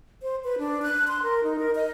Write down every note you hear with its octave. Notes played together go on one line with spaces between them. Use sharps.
C5
B4
D4
F#6
C6
A#4
D#4
A#4
D#5